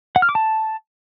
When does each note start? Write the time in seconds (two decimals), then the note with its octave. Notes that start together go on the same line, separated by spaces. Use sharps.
0.16 F#5
0.22 F6
0.29 D6
0.35 A5